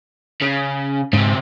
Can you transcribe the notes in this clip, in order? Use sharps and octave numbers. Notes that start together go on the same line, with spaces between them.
C#3
G#2 C#3 C4